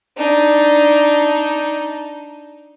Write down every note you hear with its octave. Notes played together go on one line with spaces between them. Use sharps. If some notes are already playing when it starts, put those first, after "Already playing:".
D4 D#4